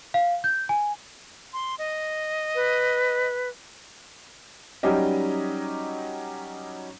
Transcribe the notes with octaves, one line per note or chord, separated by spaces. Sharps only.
F5
G6
G#5
C6
D#5
B4
F#3 G3 C#4 D#4 G4 D#5